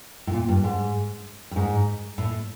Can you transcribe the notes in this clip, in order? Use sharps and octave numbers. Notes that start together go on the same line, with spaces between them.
A2
A#2
G2
G#2
G2
G#2
A2